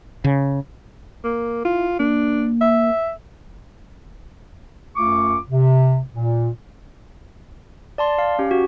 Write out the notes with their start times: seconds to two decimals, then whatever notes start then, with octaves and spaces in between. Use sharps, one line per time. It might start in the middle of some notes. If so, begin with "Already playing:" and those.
0.24 C#3
1.24 A#3
1.65 E4 F4
1.99 A#3 D4
2.61 E5
4.96 F#2 A3 F4 C#6 D6
5.49 C3
6.15 A#2
7.98 D5 A5 C6
8.18 F5
8.39 C#4 G4
8.51 F#4